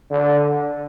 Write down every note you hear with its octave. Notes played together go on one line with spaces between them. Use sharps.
D3